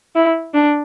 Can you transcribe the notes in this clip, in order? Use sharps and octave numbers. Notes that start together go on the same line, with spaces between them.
E4
D4